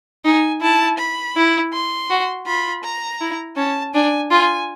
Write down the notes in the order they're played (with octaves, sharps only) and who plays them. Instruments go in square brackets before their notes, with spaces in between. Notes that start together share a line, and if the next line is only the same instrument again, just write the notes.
[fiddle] D#4 [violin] G#5
[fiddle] E4 [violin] A5
[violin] B5
[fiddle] E4
[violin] C6
[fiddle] F#4
[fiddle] F4 [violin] B5
[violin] A#5
[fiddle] E4
[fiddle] C#4 [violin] A5
[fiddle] D4 [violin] G#5
[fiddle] F4 [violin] G#5